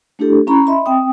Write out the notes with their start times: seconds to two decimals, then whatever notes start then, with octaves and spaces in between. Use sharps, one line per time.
0.19 A3 D4 E4 G4 A4
0.47 C#4 E4 A#5 B5 C#6
0.66 D#5 E5 B5 C6
0.86 C4 G5 D#6